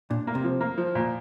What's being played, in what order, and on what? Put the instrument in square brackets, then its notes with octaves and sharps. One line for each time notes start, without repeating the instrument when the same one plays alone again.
[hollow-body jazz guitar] A#2 [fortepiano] D4
[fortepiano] A#3
[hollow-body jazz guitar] C3
[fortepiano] F3
A#3
F3
A#2